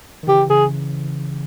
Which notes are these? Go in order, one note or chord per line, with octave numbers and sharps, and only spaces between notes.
D#3
C#3 E3 G4
C#3 E3 G#4